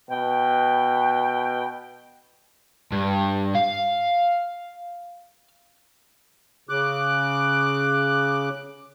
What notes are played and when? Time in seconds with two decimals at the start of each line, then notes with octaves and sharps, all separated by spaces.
0.10 B2 G5
2.92 G2
3.55 F5
6.69 C#3 D6 F#6